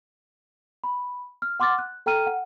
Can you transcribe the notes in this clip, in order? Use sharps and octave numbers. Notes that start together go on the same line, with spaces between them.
B5
F6
F#5 C6 D6 F6 A6
F#6
A4 G5 A#5 F6 D#7
F#5